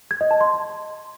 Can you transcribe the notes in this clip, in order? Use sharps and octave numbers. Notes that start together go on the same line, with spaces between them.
G#6
D#5
A5
C6